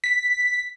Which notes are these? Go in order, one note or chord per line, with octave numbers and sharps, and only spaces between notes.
B6